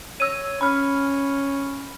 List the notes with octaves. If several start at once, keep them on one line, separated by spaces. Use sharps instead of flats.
C#5 E6 D#7
C#4 B5 F6